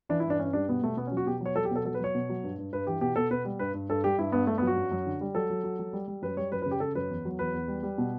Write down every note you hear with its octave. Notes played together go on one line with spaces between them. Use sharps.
E3 D4
E4
G2
D4
G2 C#4
G3 D4
B2 B3
B2 A3
B2 B3
C#4
F#3
F#4
B2 G4
F#3 C#5
F#3 A4
G4
B2 A4
F#3 A4
B4
F#3 C#5
B2
F#3
G2
G2
G2 B4
E3 G4
B2 G4
B2 A4
B2 B4
G3
G2 B4
G2
G2 A4
G3 G4
G2 E4
G2 B3
G2 A3
B3
F#3
F#4
F#2
F#2
D3
G3
F#3 A4
F#3
F#3
F#3
G3
G3
F#2 B4
G3 C#5
F#2 B4
B4
C#3
G4
C#3 A4
F#2 B4
E2
F#3
E2 B4
E2
G3
G3
B2